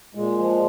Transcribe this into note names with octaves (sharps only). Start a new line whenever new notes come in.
A#2 G#3
F3